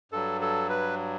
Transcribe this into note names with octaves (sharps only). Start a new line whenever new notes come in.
G2 F#3 A4
A4
B4